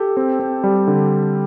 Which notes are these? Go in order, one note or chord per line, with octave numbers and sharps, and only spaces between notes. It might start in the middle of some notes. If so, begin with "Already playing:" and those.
Already playing: G4 A4
C4
C4
G3
D3